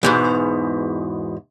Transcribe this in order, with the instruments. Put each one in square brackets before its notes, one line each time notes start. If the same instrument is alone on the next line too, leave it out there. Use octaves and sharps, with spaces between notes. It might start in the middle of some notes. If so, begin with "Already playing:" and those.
[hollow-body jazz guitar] E2 G#2 B2